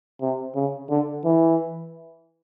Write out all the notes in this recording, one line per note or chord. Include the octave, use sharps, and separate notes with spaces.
C3
C#3
D3
E3